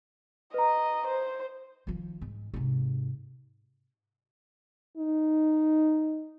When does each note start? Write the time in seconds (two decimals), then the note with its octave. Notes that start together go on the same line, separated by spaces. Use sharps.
0.54 B4 D#5 A#5
1.07 C5
1.87 D#3 F3
2.21 G#2
2.54 G#2 C3
4.97 D#4